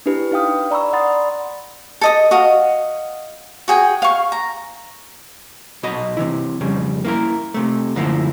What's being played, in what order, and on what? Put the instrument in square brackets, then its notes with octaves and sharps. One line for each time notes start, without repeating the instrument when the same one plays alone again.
[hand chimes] D4 E4 G4 B4
D#4 B4 F5 G5 D#6 F6
D5 A#5 B5 C#6 E6
D5 F#5 B5 C6 D#6 A6
[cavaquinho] A4 D#5 D#6
F#4 D#5 F5
F#4 G#4 G5
F5 C#6
A#5
[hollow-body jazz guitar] B1 F#4 D#5 B5
C3 E3 E4
F2 C#3 G3
A#3 E4 A#4
C3 A3
F#2 D3 F3 A3 A#3 E4